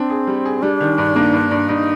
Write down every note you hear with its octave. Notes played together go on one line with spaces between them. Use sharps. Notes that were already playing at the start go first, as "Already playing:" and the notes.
Already playing: C4 D4
G#4
G3
G#4
G3 D4
D#3
G2
A#3
G2
G2
G2 D#4